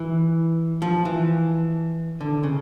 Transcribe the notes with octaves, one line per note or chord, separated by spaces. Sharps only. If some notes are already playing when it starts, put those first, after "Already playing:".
Already playing: E3
F3
E3
D3
C#3